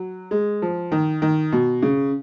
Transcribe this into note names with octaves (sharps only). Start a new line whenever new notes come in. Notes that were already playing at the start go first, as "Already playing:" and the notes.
Already playing: F#3
G#3
F3
D#3
D#3
B2
C#3